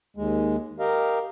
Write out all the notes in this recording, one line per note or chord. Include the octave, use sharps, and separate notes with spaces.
D#2 G#3
G4 A#4 D#5 F5